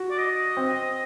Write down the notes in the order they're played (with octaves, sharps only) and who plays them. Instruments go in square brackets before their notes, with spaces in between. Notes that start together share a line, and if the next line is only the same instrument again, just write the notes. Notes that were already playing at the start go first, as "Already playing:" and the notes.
Already playing: [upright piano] F#4
[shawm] D5
D#5
[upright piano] C4